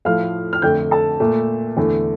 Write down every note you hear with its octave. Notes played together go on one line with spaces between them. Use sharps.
A2 F3 A3 F5 F6
F6
F2 D3 A3 G5 G6
A4 A5
A#2 A3
E2 D3 A3